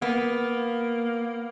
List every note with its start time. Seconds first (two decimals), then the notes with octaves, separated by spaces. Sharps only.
0.02 A#3 B3